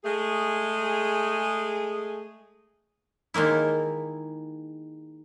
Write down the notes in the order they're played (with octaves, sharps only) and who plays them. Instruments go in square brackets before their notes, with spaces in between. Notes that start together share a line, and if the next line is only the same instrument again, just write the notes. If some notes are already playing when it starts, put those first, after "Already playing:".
[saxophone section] G#3 A3 G#4
[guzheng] D#3 G#3 A#3 E4